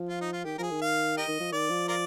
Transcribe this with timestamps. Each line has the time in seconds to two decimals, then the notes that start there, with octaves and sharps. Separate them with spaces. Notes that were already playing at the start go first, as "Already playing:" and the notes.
Already playing: F3
0.09 F4
0.21 D#4
0.33 F4
0.44 D#3 G4
0.58 F3 G#4 A#4
0.71 D#3
0.81 F5
1.17 G4 A#4 D#5
1.28 D#3
1.40 F3
1.52 D#3 D5
1.70 F3
1.88 F4 A#4 D5